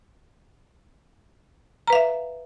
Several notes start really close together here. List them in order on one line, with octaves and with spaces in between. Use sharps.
A#5 B4 F5 E5